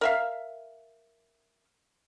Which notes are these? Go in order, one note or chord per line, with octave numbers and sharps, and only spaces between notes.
A#4 E5 F5